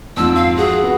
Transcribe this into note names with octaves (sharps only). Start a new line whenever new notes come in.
F2 G#2 F3 E6
F5
F#4 G#4
B3 F#4